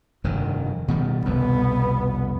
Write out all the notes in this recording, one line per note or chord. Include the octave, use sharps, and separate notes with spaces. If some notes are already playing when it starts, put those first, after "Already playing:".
F1 G2 D#3
B2 D#3 G3
F1 C2 F2 B2 B3